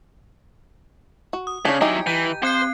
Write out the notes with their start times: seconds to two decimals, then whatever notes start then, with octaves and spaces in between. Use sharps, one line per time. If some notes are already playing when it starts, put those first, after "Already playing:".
1.33 F#4
1.47 D#6
1.65 C#3 D4 C#5 G#6
1.81 F#3 D#4 E4 G4 G#5
2.07 E3 G6 D#7
2.43 C4 C5 F#6 C7